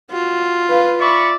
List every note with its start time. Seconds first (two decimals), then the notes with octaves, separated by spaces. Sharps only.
0.12 F4 F#4
0.69 B4 F5
1.01 D5 E5 B5 C#6